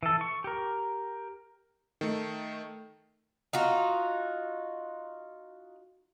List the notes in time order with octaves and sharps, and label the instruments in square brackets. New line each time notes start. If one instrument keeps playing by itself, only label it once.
[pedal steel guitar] E3 A4
C#6
G4 A#4
[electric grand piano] D#3 A3
[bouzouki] D#4 F4 F#4